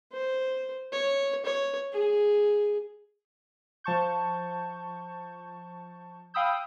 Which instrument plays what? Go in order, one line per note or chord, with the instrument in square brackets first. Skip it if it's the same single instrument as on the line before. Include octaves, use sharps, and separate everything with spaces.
[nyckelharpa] C5
C#5
C#5
G#4
[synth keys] F3 A5 C#6 G6
F5 G5 B5 D#6 E6 G6